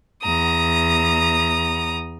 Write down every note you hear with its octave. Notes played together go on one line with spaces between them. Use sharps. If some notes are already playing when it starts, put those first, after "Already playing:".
E2 A#5 D#6